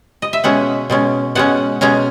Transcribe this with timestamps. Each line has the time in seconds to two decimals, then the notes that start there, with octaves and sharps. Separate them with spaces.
0.22 D#5
0.33 E5
0.44 B2 G#3 C#4 F#5
0.90 B2 G#3 C#4
1.35 B2 G#3 C#4 F#5
1.81 B2 G#3 C#4 A#5